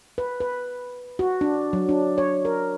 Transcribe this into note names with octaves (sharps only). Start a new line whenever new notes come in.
B4
B4
F#4
D4
F#3
D4
C#5
A#4